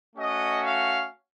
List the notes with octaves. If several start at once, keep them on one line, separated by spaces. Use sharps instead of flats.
A3 C#4 F#4 D#5
F5